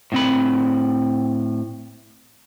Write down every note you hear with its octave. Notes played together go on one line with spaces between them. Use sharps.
A2 C4 B5